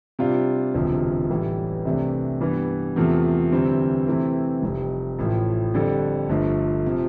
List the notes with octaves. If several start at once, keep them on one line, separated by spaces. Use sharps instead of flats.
C3 G3 D4 F4
E1 D2 C3 F3
A1 A2 E3 G3
C2 C3 E3 A3 D4
G2 E3 G3 B3
E2 C3 F3 A3
D2 C3 E3 G3 C4
C3 E3 A3 C4 E4
F1 F2 C3 G3
A1 A2 F3 A3 E4
F2 D3 G3 D4 A4
G1 G2 F3 A3
C3 F3